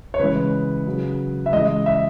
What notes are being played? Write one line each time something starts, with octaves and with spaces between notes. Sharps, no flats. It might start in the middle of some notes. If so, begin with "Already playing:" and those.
C#5
C#3 E3 G#3 B4
C#3 F#3
E5
C#3 E3 G#3 D#5
E5